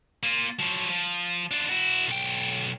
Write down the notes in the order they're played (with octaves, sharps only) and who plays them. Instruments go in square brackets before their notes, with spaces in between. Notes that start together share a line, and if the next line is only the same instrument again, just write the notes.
[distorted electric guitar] A#3 F4
F3 F#3
F3
D4 F4
E4 F#4
B1 G5